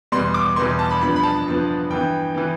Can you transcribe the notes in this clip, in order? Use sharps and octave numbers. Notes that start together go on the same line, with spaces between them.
E2 B2 G3 B3 C6
D6
E2 B2 G3 B3 C6
A5
B5
G2 F3 B3 B5
B5
A5
G2 F3 B3
G2 E3 B3 G5
E3 B3